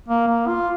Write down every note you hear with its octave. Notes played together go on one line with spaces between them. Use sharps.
A#3
A#3
F4